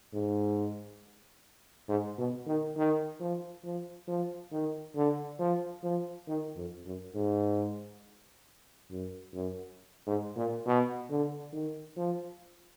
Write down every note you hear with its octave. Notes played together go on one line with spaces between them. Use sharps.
G#2
G#2
B2
D#3
D#3
F3
F3
F3
D#3
D3
F3
F3
D#3
F2
F#2
G#2
F#2
F#2
G#2
A#2
B2
D3
D#3
F3